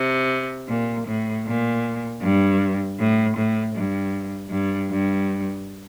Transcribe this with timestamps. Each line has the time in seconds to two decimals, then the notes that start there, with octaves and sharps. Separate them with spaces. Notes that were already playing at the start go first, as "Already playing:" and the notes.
Already playing: C3
0.68 A#2
1.06 A2
1.45 A#2
2.22 G2
2.98 A2
3.35 A2
3.73 G2
4.50 G2
4.89 G2